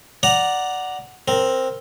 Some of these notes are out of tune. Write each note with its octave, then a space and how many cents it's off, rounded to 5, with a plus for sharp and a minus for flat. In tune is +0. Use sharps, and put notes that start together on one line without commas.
D5 +0 F#5 +0 A#5 +0
C4 +5 A#4 +0